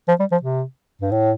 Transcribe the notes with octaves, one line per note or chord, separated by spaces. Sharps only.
F3
G3
F3
C3
G2
A2